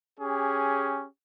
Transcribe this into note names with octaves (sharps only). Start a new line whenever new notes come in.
C#4 G4 G#4